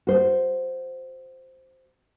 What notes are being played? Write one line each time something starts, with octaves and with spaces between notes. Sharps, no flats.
F#4 C5